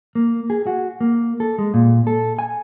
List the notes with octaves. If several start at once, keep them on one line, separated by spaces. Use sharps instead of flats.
A#3
G#4
F#4
A#3
A4
G#3
A#2
A4
G#5